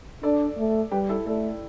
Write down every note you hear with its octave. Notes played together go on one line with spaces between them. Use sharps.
D4 A4 D5
A3
G3 G4 B4
E4 A4
A3 A4 D5